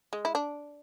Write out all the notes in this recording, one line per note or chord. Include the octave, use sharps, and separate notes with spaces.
G#3
E4
D4